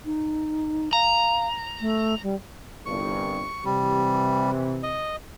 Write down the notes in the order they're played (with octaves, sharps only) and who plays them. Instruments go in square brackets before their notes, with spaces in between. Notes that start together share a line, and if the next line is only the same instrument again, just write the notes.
[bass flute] D#4
[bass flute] F5 [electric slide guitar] A#5
[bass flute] A3
G3
[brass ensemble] G1 C2 G2 [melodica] C#6
[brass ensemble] C3 E3 [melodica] G3
[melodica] D#5